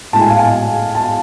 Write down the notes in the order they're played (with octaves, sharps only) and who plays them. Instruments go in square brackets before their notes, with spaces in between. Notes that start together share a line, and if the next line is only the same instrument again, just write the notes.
[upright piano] A2 G#3 A5
G#5
F5
G#5
A5